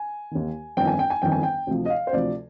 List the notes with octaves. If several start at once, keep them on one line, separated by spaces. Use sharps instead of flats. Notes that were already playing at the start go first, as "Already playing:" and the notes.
Already playing: G#5
D#2 D#3
G1 F2 D#3 G5
G#5
G5
G#5
G1 F2 D#3 G5
G#5
G5
D2 C3 F3
D#5
F5
C5
D2 C3 F3 D5